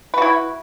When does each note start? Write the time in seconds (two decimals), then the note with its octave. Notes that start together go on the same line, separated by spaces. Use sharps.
0.14 B4
0.18 F#4
0.22 E4